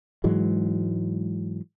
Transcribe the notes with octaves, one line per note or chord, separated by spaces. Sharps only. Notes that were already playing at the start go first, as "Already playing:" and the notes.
G#2 E3 F#3 G#3